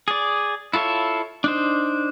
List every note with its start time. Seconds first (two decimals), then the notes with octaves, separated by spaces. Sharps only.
0.08 G#4 D5
0.74 E4 F4 A4 C#5 E5
1.44 D4 D#4 C5